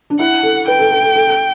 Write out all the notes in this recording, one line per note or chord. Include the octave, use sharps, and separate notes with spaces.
D4
E4 F#5
A4
B4 G5
A4
A4
A4
A4
A4